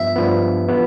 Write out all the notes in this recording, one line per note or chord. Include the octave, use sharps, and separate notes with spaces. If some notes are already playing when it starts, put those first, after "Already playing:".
Already playing: G2 F3 B3 E5
G2 F3 B3
E3 B3 F4